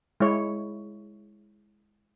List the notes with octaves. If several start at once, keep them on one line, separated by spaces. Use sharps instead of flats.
G#3 E4 C#5